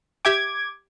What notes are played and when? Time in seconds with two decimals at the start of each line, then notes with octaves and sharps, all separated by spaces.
0.25 G4 E5 G5 D6 G#6